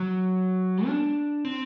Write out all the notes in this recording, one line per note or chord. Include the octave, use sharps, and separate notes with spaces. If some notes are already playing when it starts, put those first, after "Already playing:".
Already playing: F#3
D4
C4